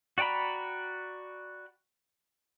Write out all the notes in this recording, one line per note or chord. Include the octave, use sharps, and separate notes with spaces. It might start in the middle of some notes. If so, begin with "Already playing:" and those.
F#4 D5 G5 A#5 B5